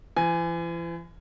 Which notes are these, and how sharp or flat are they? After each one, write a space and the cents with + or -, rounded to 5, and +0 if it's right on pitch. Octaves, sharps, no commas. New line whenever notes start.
E3 +45 G#5 +0